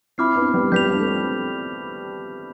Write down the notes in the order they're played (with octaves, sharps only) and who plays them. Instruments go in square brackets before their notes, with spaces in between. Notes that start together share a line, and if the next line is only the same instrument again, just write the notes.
[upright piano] C4 E4 [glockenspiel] B5 D6 F6 C7
[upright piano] B3 D4
G3 B3
[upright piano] G3 B3 [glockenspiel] G6 B6 F7
[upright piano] D4
A3 C4